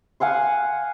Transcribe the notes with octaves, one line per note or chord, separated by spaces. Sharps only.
F5 F#5 G#5 C6